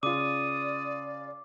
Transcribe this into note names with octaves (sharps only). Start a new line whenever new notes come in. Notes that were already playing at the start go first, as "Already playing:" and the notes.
C#3 F4 D5 D6 D#6